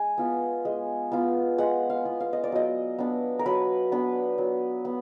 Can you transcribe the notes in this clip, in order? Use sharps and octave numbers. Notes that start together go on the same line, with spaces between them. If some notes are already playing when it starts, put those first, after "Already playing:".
Already playing: G#3 G#5
B3 F4
G#3
B3 F4
G#3 F#5
F5
B3 F4
F5
D#5
D5
F#3 D#5
B3 D4
A#4
F#3 B4
B3 D4
F#3
B3